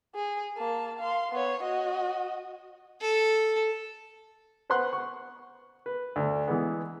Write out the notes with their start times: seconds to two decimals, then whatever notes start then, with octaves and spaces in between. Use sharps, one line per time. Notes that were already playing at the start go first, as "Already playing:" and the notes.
0.15 G#4
0.58 A#3 A5
0.99 F5 C6
1.32 B3 C#5
1.63 F#4 D#5
3.01 A4
4.70 B4 C5 F#5 C6 F#6
4.93 C#6
5.86 B4
6.16 D2
6.48 E3 G#3 B3